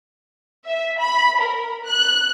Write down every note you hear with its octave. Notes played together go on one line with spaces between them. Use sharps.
E5
B5
A#4
F#6